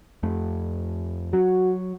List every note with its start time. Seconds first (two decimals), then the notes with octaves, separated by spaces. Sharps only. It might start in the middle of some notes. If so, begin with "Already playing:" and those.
0.23 F2 A3
1.33 F#3 F#4